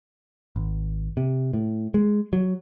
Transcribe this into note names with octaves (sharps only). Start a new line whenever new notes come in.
G#1
C3
A2
G#3
F#3